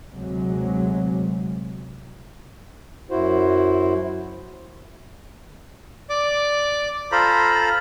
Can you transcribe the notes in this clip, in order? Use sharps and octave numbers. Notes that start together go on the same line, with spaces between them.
D2 C3 F#3 G#3
F#2 E4 F#4 C5
D5 D6
F4 A4 C5 A#5 B5